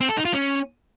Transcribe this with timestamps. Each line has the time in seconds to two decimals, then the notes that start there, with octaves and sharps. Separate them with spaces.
0.01 C4
0.09 A4
0.17 D#4
0.25 F4
0.33 C#4